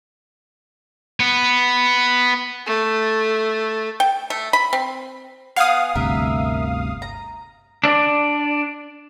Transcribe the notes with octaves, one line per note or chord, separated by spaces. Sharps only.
B3
A3
G5
A3
B5
C4
B3 F5 F#5 G#5 D#6
G1 D2 C3 A#4 E5
A#5
D4 D5